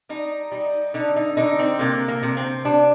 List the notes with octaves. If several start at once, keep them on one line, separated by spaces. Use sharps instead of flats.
G3 D#4
G3
D3 D#4
D#4
D3 D#4
C4
C3 A#3
A#3
C3
C4
G3 D4